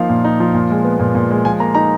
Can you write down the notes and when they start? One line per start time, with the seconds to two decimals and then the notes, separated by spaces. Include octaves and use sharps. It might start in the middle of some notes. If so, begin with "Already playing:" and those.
Already playing: F3 A#3 D#4 F5
0.09 A#2
0.25 D#4
0.40 F3
0.54 A#2
0.70 G#3
0.84 B3
1.00 A#2
1.15 A#2
1.31 G#3
1.45 F3 G#5
1.60 A#3 A#5
1.75 D#4 A#5